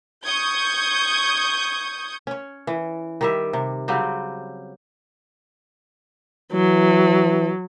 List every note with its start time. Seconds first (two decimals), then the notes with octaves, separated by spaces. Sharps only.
0.24 C#6 D#6 G6 G#6
2.27 C#4 C#5
2.67 E3
3.21 D#3 G3 E5
3.53 C3
3.88 C#3 F#3 G3 C4
6.53 E3 F#3